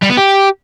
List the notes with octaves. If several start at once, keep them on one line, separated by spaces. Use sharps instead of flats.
G3
B3
G4